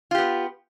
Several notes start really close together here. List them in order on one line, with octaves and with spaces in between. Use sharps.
F4 G4 B3